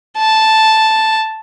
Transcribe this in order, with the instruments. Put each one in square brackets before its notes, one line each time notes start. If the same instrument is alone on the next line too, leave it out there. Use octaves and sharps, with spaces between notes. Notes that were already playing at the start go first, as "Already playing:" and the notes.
[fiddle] A5